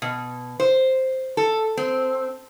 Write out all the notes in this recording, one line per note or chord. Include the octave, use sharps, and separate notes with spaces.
B2
C5
A4
C4